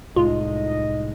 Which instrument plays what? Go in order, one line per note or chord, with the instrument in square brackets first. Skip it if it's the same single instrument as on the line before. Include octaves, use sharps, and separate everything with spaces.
[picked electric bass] C2 A2 G#3 [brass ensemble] D#4 D#5 [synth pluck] F4